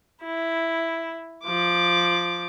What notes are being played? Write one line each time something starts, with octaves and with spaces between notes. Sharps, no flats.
E4
F3 D6